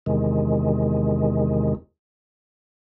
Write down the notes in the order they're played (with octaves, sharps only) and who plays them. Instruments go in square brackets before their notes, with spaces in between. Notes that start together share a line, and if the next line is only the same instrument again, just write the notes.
[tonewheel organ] E2 C3 D#3 G#3